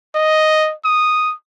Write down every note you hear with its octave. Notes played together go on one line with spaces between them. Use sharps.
D#5
D#6